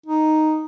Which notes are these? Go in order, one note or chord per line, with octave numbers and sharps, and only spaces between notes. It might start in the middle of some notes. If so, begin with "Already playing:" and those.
D#4